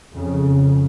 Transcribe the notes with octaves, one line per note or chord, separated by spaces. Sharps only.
F2 C#3